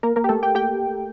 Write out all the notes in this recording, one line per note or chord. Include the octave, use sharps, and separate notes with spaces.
A#3 A#4
A#3 A#4
G4
A3 A4
G4 G5
G4 G5